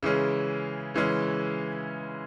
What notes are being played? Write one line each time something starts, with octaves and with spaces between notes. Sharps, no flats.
C#3 E3 G#3 C#4
C#3 E3 G#3 C#4